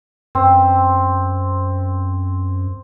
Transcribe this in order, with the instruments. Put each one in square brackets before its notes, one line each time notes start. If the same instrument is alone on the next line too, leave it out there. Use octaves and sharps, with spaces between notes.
[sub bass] F#2 [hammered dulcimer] C4